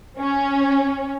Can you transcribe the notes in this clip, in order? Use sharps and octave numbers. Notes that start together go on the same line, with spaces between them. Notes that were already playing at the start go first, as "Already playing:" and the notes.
C#4